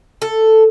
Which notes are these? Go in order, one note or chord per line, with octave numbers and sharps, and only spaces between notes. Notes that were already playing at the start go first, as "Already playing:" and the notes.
A4